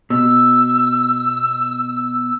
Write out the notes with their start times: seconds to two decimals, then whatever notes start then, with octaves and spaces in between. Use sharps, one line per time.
0.10 B2 E6